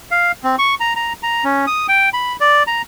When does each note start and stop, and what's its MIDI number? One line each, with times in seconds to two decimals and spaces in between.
0.11 0.32 77
0.44 0.56 60
0.58 0.75 85
0.80 0.94 82
0.96 1.13 82
1.23 1.44 82
1.44 1.66 61
1.67 1.87 87
1.88 2.10 79
2.13 2.36 83
2.40 2.63 74
2.67 2.82 82